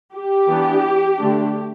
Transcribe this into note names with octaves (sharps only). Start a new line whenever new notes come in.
G4
E3 B3 D4
D3 A3 D4